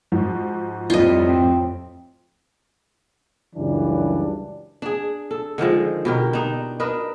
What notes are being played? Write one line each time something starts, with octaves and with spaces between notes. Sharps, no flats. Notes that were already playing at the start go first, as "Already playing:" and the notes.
G#2 F3 F#4
F2 A2 C3 G3 F4 D#5
C4 C5
C#2 F#2 C#3 E3 G3 D4
D4 G#4
A4
D3 D#3 F3 G#3
B2 G4 A#4
D4 D#4
D4 A#4 B4 D#5